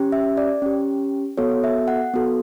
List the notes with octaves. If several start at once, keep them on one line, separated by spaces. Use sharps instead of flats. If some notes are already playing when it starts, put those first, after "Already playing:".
Already playing: C#4 G4
E5
D5
C#4 G4
B3 F#4 A4 C#5
E5
F#5
B3 F#4 A4